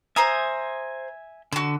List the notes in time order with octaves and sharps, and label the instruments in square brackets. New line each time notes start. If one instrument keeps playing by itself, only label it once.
[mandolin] C5 A#5 D#6 [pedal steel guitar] E5 G#5
[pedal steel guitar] D3 [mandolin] F#4 E6